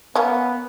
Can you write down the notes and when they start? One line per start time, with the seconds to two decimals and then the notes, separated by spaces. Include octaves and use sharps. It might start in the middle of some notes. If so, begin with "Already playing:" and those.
0.15 A#3 B3 C#4